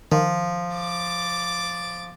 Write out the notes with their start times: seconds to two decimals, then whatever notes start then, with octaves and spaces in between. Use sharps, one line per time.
0.12 D#3 F3
0.75 D6 A6